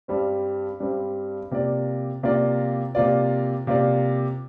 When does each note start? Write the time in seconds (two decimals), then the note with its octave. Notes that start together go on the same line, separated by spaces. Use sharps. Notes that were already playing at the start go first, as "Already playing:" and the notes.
0.08 G2 G3 C4
0.80 G2 G3 C4
1.51 C3 A#3 F4 D5
2.23 C3 A#3 F4 D5
2.95 C3 A#3 F4 D5
3.67 C3 A#3 F4 D5